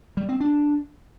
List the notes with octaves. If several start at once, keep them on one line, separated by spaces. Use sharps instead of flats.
G3
C4
D4